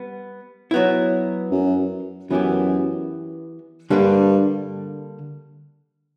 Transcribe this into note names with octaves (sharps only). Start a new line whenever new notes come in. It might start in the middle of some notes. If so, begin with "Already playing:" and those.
Already playing: G3 B3
F#3 B3 E4
F#2
F#2 E3 B3 E4 G4
G2 D3 G3 A#3 D4